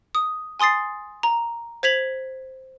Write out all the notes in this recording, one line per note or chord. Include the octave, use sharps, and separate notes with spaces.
D#6
G#5 C6 D#6 A6 C7
A#5
C5 G#6 B6 F7 F#7